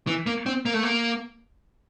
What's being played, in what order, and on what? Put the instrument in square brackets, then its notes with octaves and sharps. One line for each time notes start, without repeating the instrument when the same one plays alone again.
[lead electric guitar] E3
A#3
C4
A#3
A3
A#3